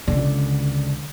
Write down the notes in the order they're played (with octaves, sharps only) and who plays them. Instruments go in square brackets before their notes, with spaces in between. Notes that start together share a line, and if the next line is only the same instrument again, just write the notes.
[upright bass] C#2 D3